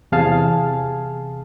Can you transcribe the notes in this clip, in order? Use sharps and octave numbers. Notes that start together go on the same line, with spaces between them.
E2 C3 G#4 F5 G#5 A5